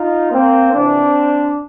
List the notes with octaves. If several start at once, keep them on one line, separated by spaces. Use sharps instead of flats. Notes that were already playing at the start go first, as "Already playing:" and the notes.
Already playing: D#4 F4
A#3 C4
F2 C3 E3 C4 D4